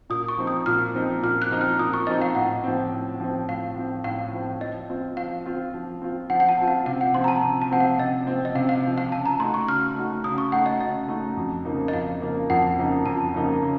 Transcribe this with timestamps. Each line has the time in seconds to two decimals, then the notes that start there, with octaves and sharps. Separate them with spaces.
0.10 A#2 D#6
0.28 C#6
0.38 F3 C4 D#4
0.47 D#6
0.66 A#2 F6
0.94 F3 C4 D#4
1.23 A#2 F6
1.42 F#6
1.51 F3 C4 D#4
1.61 F6
1.79 A#2 D#6
1.94 C#6
2.07 F3 C4 D#4 D#5
2.22 F5
2.35 A2 F#5
2.64 F3 C4
2.92 A2
3.20 F3 C4
3.48 A2 F5
3.76 F3 C4
4.04 A2 F5
4.32 F3 C4
4.60 F3 D#5
4.90 C4 F4
5.17 F3 F5
5.46 C4 F4
5.74 F3
6.02 C4 F4
6.30 F3 F#5
6.40 F#5
6.49 A5
6.58 C4 F4
6.68 F5
6.86 C3 F5
7.01 F#5
7.14 F3 C4 C6
7.24 A#5
7.28 A5
7.42 C3
7.62 A5
7.71 F3 C4 F#5
7.80 F5
7.98 C3 D#5
8.27 F3 C4
8.45 D#5
8.55 C3 F5
8.69 F5
8.83 F3 C4
8.98 F5
9.12 C#3 A5
9.26 A#5
9.39 A3 D#4 F#4 C6
9.54 C#6
9.68 C#3 F6
9.96 A3 D#4 F#4
10.24 C#3 D#6
10.38 C#6
10.52 A3 D#4 F#4 F#5
10.66 D#5
10.81 C#3 D#5
11.08 A3 D#4 F#4
11.37 F2
11.65 C#3 F3 A#3 D#4
11.88 D#5
11.93 F2 F5
12.21 C#3 F3 A#3 D#4
12.50 F2 F#5
12.78 C#3 F3 A#3 D#4
13.06 F2 A5
13.34 C#3 F3 A#3 D#4
13.62 C#3